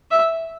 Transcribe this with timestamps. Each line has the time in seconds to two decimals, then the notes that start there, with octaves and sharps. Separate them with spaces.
0.11 E5